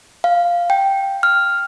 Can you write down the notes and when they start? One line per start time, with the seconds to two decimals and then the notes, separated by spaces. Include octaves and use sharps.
0.24 F5
0.70 G5
1.23 F6